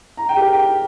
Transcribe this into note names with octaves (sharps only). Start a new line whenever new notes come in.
A#5
G5
G4
A#4
G5